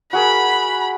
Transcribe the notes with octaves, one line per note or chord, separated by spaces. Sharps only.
F#4 G#4 A#4 B5